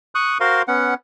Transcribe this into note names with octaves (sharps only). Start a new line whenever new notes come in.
C#6 D#6 F#6
F#4 A#4 C5 F5 C6
B3 C#4 F#5